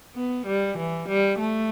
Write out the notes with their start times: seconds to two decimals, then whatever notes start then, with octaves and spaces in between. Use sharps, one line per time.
0.15 B3
0.46 G3
0.77 E3
1.08 G3
1.39 A3